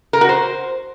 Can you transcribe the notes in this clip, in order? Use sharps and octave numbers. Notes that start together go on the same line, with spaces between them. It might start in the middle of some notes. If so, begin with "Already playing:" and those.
A#4
F#4
C5